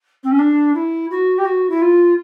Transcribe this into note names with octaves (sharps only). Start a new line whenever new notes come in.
C4
C#4
D4
E4
F#4
G4
F#4
E4
F4